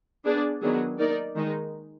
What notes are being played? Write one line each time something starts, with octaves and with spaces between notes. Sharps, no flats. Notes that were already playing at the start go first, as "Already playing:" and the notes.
B3 D4 G#4 D5
D#3 F#3 B3 D4 G#4
A#3 D#4 A#4 D5
D#3 G#3 D#4